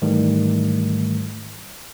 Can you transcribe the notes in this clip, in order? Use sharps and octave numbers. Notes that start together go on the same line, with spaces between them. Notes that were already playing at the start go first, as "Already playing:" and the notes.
G#2 D#3 E3 G3 A3